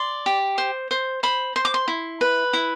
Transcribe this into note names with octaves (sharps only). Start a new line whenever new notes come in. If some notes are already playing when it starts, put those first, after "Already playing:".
Already playing: D5 C6
G4
C5
C5
C5 B5
C5 C6
D6
C6
E4
B4
E4